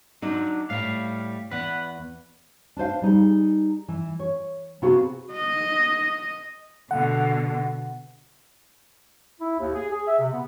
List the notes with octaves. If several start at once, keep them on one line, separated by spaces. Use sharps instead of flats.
F#3 D4 D#4
A2 G3 F5
E2 B4 F#5
D4 B4 C5 F5
G3 D#4 G#4
E3
C#5
C3 B3 F4 F#4 G#4
D#5
B2 D3 F#5
E4
D#2
G#4
G#4
E5
C3
B3